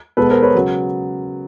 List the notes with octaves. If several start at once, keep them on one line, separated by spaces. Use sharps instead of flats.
B2 G#3 B3 A4 B4
A#4 C5
B4 C#5
C#3 F#3